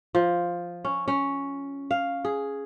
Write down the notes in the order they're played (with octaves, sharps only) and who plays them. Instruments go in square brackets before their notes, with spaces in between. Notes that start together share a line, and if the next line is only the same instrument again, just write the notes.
[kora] F3
C#4
C#4
F5
G#4